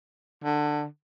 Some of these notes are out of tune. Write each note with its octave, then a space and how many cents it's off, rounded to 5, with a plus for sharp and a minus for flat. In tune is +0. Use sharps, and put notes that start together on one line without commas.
D3 +15